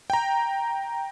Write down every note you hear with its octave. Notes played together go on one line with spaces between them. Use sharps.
G5 A#5